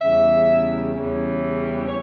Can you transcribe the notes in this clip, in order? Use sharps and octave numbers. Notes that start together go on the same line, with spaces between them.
E2 C#3 E3 G3 C#4 E5
E2 C#3 E3 G3 C#4
C#5